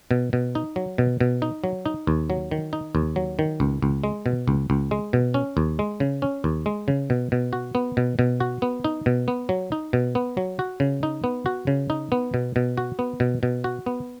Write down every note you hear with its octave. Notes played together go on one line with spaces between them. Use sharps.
B2
B2
D#4
F#3
B2
B2
D#4
F#3
D#4
D#2
F#3
D#3
D#4
D#2
F#3
D#3
C#2
C#2
G#3
B2
C#2
C#2
G#3
B2
C#4
D#2
G#3
C#3
C#4
D#2
G#3
C#3
B2
B2
F#4
B3
B2
B2
F#4
B3
D#4
B2
B3
F#3
D#4
B2
B3
F#3
F#4
C#3
D#4
B3
F#4
C#3
D#4
B3
B2
B2
F#4
B3
B2
B2
F#4
B3